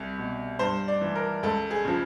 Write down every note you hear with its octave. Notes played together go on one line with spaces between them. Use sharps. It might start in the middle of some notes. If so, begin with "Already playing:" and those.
Already playing: C2
B2
G2 C5
D5
E3
A#4
C#2 A4
G#4
C#3 F3